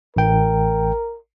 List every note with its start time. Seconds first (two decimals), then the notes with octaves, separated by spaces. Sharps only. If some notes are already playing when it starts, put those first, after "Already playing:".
0.16 A1 A#4 G5